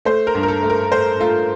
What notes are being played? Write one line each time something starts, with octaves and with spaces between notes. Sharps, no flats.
A3 C5
A#4
G2
A#4
A4
A3
A#4
A3 C5
A3 F4